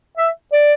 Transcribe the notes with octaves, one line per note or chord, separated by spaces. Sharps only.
E5
D5